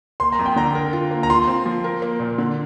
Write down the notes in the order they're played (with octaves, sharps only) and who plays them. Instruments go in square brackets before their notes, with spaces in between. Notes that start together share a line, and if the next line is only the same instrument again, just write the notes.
[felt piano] A#3 [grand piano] C6
[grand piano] A#5
[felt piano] F2
[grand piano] G5
[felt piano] D3 [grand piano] A#5
[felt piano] A#4
F4
A#3
[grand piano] A#5
[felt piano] F4 [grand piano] C6
[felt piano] C4
F3
A#4
A#3
A#2
D3